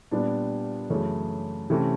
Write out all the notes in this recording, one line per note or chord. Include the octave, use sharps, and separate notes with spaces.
A#2 G3 B3 D4
F#2 C#3 E3 A3
C3 E3 A3 C#4